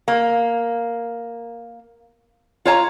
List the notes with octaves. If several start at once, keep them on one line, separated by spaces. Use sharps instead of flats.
A#3
F4 C#5 A5 A#5